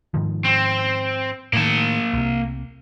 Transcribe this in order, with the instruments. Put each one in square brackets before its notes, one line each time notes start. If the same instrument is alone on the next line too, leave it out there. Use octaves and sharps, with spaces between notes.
[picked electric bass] G#2 D#3 F3
[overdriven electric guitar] C4
[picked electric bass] A2 D#3 [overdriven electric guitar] A#3 A5
[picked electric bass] C2 C3